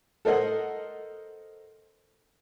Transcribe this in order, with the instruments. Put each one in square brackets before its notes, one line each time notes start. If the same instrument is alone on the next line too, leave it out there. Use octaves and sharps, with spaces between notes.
[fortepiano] A4 A#4 C5 D#5 F#5